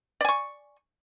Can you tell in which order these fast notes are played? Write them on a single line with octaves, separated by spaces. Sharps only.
D5 G#5 C#6